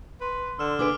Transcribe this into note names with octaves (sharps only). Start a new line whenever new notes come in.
B4 C6
D3 E6 F6 E7
D4 G#4 B4 G#5 D6 D7